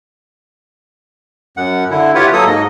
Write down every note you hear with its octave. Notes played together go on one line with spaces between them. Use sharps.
F#2 F#5
D3 E4
E4 F4 G4 B4 C#5 F#5
F#3 A#3 A4 D#6
G#2 D#5